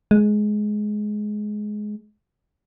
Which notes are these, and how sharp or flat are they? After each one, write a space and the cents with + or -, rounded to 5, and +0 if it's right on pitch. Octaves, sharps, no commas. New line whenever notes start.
G#3 +15